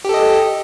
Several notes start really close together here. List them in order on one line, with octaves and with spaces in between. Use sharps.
G4 A4 D#5